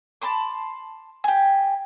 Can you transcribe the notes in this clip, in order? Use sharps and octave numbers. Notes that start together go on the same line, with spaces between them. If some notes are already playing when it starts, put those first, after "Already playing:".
A5 B5 C6 D6
G4 G#5